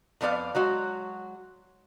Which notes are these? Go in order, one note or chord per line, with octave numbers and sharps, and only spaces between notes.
F2 F3 B3 D5 F5
F#3 G#3 F#4